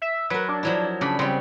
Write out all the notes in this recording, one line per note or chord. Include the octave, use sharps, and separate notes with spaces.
E5
F#3 A#4 B4
D4
F3 F#3 E4
C#3 D4 B5
C#3 G3 C4